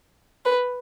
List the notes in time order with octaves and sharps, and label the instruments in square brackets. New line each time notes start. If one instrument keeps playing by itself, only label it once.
[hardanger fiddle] B4